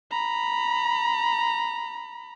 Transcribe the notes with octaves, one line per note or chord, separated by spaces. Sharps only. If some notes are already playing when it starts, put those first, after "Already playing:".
A#5 B5